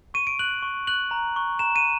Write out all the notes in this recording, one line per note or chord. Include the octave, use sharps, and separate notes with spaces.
C#6 D#7
D7
F#6 F#7
C#6
F#6 F#7
A#5
C#6 F#6
A#5 E7
D#7